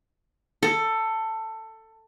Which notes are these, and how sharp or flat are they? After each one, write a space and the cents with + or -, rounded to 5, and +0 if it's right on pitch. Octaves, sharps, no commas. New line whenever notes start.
A4 +15